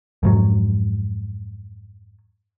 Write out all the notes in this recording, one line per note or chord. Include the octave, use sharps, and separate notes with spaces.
F2 G#2 F#3